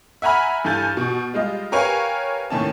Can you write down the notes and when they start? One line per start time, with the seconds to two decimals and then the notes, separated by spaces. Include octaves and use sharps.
0.22 E5 F#5 G#5 A#5 B5 F6
0.64 G2 E3 A4 G#5 G6 A6
0.97 B2
1.34 G3 G#3 F4 D#5
1.72 G4 A#4 B4 C#5 F5 G#5
2.50 D#2 A2 D#3 C#4 A5